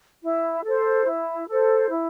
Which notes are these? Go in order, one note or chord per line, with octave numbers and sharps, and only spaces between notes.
E4
A4 C5
E4
A4 C5
E4